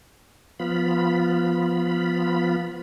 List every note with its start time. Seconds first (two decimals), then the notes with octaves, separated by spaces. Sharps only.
0.60 F3 B3 F4 B5